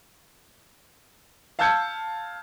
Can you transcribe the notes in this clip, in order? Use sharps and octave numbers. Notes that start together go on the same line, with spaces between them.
F5 A5 E6 G6 G#6 C#7